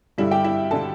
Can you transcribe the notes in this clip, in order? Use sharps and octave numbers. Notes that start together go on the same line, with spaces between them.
G2 D3 G3 E4 E5
G4 G5
E4 E5
D3 G3 A4 A5